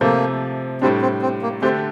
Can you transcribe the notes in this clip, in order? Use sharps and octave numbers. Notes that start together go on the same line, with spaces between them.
C3 F3 A3 A#3
A2 G3 C4 D4
C4
C4
A#3
D3 A3 C4 D4 G4